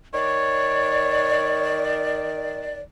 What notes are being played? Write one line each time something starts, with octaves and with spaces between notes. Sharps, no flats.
D#3 C#5 D5